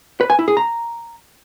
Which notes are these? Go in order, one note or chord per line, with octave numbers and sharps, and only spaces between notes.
B4
G#5
E4
G#4
A#5